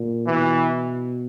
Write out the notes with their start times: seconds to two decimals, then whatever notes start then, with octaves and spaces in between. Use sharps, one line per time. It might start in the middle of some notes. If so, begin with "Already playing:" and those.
Already playing: A#2
0.27 B2 E3